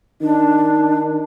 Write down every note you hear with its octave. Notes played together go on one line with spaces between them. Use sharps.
D#3 D4 D#4